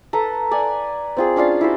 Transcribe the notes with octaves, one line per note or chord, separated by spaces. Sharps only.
A4 B4 A5 A#5
D5 F#5 G#5
C4 F4 G#4
C#4 D4 F4 F5
E4 F#4 C5